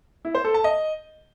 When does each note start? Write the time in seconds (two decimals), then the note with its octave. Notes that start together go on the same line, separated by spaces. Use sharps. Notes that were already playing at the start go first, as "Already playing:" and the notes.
0.25 E4
0.35 C5
0.44 A4
0.54 A5
0.64 D#5